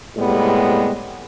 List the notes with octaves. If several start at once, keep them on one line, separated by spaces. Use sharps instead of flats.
A2 C3 G3 G#3 B3